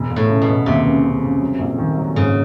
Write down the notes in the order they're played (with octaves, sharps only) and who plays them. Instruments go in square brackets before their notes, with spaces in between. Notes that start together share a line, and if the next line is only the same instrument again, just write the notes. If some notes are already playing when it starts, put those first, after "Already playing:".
Already playing: [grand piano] E1
E1
[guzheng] A2
[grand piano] C#3
[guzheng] B2
[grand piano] E1
[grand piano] D#2 [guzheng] C3
[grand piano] C#3
C#3
C#3
F#3
A#1
D#3
F#3
[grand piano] G#2 [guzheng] C#3